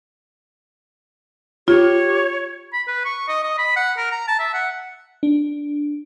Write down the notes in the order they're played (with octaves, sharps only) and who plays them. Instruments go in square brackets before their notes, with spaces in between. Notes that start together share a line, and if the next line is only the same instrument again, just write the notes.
[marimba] F4 [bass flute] G4 [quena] C#5
[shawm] B5
B4
C#6
D#5
D#5
B5
F#5
A#4
A#5
A5
E5
F#5
[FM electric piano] D4